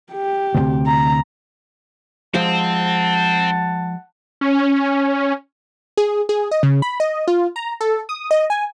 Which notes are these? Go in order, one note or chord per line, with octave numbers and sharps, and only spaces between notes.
G4
D2 A2 C3
A#5
F3 G#3 C4 F#5 A5
C#4
G#4
G#4
D#5
C#3
B5
D#5
F4
A#5
A4
D#6
D#5
G#5